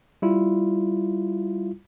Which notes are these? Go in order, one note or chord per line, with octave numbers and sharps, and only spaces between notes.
G3 E4 F4